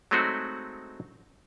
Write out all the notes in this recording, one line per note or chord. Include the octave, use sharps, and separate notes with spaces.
F#3 G#3 A3 C4 D#4 F#4